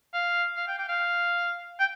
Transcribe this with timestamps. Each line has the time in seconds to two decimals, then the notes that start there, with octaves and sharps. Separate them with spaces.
0.13 F5
0.56 F5
0.68 G5
0.78 G5
0.88 F5
1.80 G5